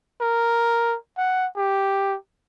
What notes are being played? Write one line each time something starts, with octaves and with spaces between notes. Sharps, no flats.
A#4
F#5
G4